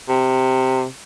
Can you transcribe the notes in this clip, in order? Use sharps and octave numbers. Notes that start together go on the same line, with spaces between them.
C3